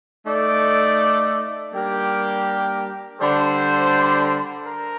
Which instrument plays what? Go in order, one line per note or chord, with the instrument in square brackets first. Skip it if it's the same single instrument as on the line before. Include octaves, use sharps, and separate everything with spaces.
[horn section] A3 D#4 A4 D5
G3 A#3 D4 G4 A#4
D3 G3 D4 A4 C5
A#4